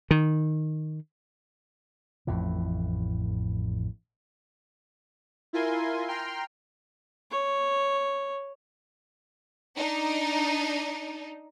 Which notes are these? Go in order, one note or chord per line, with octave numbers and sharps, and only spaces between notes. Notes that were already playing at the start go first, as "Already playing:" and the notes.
D#3
A1 F2 A2 E3
E4 F4 A#4 G#5 C6
G5 A#5 C6 F6
C#5
D4 D#4